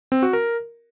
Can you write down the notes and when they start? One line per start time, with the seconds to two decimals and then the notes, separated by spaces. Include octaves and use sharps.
0.12 C4
0.23 F#4
0.33 A#4